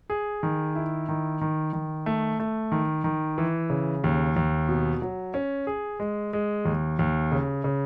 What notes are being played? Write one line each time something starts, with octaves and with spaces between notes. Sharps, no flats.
G#4
D#3
E4
D#3
D#3
D#3
A3
A3
D#3
D#3
E3
C#3
D#2
D#2
B2
F#3
C#4
G#4
G#3
G#3
D#2
D#2
C#3
C#3